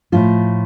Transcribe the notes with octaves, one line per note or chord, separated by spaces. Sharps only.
A2 F3 F4